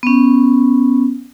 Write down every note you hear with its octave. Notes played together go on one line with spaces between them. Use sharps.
B3 C#4